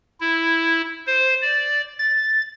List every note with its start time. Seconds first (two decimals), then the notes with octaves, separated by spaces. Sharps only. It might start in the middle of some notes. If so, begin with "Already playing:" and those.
0.21 E4
1.07 C5
1.42 D5
1.99 A6